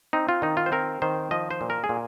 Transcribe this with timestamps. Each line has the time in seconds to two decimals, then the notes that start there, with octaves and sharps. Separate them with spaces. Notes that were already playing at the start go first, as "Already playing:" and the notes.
0.13 C4 D#4
0.29 F4
0.42 D#3 D#4
0.57 F4
0.66 C5
0.72 C4 A#4
1.02 D#3 C5
1.31 F3 D#5
1.51 C5
1.61 A#2
1.70 A#4
1.84 G#4
1.89 A#2